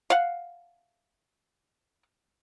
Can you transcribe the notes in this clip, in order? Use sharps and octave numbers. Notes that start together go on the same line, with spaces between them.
F5 F#5